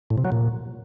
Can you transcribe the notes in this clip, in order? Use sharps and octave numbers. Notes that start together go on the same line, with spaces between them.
A2
C3
F#3
A#2